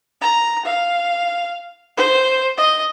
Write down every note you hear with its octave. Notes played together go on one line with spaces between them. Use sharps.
A#5
F5
C5
D#5